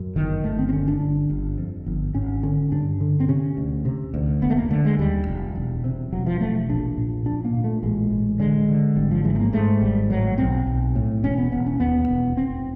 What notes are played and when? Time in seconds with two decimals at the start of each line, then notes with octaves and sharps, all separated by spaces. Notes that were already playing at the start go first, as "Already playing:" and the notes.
Already playing: F#2
0.16 G1 D#3
0.44 G1 A3
0.59 C4
0.69 C4
0.73 D3 C#4
0.88 D4
1.01 G1
1.30 G1
1.58 F2
1.86 G1
2.14 G#1 C#4
2.43 D3 C#4
2.72 G2 D4
3.01 D3
3.20 C4
3.28 C3 C#4
3.57 D2
3.85 C3
4.14 D2
4.42 F1 B3
4.50 A3
4.57 A#3
4.70 D3 A3
4.85 G#3
4.99 D#2 G3
5.27 F1
5.55 E1
5.84 C3
6.12 E1 F#3
6.26 F3
6.41 E1 A3
6.69 A#1 D4
6.98 A#2
7.26 A#2 D4
7.45 A#3
7.54 A#2
7.64 A3
7.83 A1 G#3
8.11 A1
8.40 D3 G#3
8.69 D3
8.96 G#1 G3
9.11 F3
9.24 G#2 E3
9.35 A3
9.39 A#3
9.53 G#2 A3
9.81 G#1 G3
10.10 A2 F#3
10.38 B1 C4
10.67 B1
10.95 A2
11.24 E1 C#4
11.38 B3
11.52 E1 B3
11.66 C#4
11.80 D#2 B3
12.08 E1
12.37 F1 C4